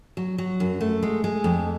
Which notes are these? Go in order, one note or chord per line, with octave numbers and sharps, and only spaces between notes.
F#3
F#3
F#2
A3
G#3
G#3
F2